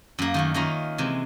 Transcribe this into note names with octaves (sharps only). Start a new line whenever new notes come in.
F#2 A#3
D#3 A3 A#3
D#3 A#3 C#4 F4 A#5
C3 E3 G#3